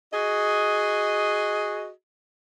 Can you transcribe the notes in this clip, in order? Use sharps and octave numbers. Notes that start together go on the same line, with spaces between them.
F#4 G#4 D#5